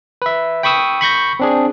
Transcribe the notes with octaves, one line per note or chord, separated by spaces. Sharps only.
B4 E5
G5 B5 C#6 D#6 E6
B5 C#6 G6 A#6
C4 D4 G#4